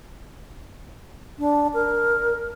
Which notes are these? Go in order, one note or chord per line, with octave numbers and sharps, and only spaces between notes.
D4
A#4